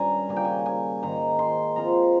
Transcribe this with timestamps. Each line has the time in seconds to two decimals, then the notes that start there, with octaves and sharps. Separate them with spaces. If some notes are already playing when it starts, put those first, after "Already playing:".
Already playing: G2 G3 C#4 G#5 A#5
0.29 C#3 G3 A#3 G#5
0.36 G5
0.45 G#5
0.66 G#5
1.03 G#2 D#3 G#3 A#5
1.39 C6
1.76 F3 C4 F4 A#5